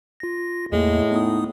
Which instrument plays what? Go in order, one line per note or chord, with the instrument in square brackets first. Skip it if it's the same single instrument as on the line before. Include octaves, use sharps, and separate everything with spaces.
[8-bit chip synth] F4 A#6
[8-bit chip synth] E2 A#3 [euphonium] A2 [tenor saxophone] G#3
[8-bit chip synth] B3 D#4 D#6